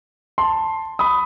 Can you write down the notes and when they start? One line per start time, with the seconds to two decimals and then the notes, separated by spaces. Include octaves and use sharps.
0.38 A5 C6
0.99 B5 D#6